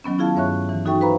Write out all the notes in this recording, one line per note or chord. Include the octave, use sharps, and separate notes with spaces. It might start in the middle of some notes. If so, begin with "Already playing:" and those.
D#3 F#3 B3 C#4
E4 F4 G#4 F5 A5
G2 C#5 E5 C#6 F#6
E3
D#4 F#4 A4 E5 G5 C#6
B4 C5 F5 A#5 B5